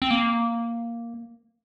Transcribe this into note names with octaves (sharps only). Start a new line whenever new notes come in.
C4
A#3